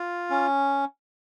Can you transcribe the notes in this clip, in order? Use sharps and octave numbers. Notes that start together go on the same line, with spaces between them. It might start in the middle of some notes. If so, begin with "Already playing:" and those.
Already playing: F4
C#4